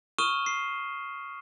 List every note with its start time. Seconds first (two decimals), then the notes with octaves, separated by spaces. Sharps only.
0.19 C#6 D#6 F6 D#7 E7 G7
0.46 C7